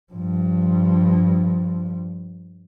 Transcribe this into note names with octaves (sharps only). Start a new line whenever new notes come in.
G2 F3